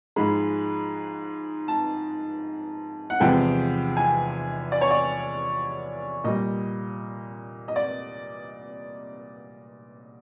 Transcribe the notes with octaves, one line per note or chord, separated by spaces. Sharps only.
G#2 F3 G#3 B5
A5
F#5
E2 C3 F3 G#3 G5
G#5
D5
C#5
D5
A#2 G3 D#5
D#5
D5